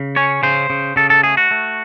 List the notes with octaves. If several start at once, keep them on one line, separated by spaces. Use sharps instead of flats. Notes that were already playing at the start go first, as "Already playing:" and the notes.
Already playing: C#3
C#4 C#5
C#3 C5
C#3
C#3 A4
A4
A3 G#4
F#4
A3